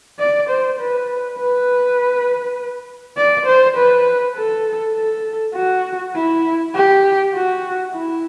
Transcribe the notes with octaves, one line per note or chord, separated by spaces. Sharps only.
D5
C5
B4
B4
D5
C5
B4
A4
A4
F#4
E4
G4
F#4
E4